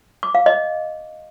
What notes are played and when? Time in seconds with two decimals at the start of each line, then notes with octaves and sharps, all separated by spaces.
0.23 D6
0.35 F5
0.46 D#5